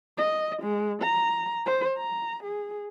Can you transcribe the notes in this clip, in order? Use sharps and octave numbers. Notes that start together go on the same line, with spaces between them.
D#5
G#3
A#5
C5
A#5
G#4